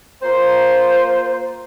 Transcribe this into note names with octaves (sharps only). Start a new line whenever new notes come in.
A#3 F4 C5